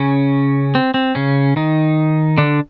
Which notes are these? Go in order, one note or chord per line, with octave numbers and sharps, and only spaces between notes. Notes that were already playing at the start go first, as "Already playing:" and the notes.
Already playing: C#3 C#4
C4
C4
C#3 C#4
D#3 D#4
D3 D4